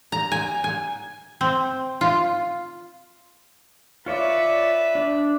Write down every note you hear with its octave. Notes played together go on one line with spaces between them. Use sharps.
A#5
G#5
G#5
C4
F4
F4 B4 C#5 D5 E5
D4